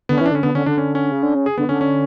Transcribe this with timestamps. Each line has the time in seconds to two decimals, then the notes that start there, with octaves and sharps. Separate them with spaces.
0.09 D3 B3
0.18 C#4
0.21 E3 D4
0.32 D3
0.35 C#4
0.43 D3 B3
0.54 D3 C#4
0.66 D3 D4
0.78 C#4
0.95 C#4
1.12 C#3
1.23 D3
1.35 C#3
1.46 G#4
1.58 D3 B3
1.68 D3 C#4
1.81 C#4